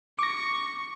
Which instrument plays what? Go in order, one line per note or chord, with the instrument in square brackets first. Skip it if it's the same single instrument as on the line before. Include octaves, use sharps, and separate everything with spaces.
[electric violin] C#6 [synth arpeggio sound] D6 A#6